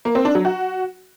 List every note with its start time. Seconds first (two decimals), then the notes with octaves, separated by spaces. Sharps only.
0.05 A#3
0.15 C4
0.25 D4
0.35 F#3
0.45 F#4